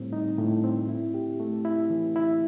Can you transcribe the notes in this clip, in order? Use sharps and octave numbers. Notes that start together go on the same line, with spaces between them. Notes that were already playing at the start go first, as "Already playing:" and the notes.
Already playing: A2 G3 C4
D#4
A2
C4
E4
G4
A3
E4
E3
E4